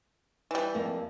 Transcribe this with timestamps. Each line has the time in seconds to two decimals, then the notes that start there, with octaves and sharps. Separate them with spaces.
0.51 E3 G3
0.75 F2 A#3